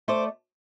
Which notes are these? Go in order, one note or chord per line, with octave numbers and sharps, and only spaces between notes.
A3 C5 D5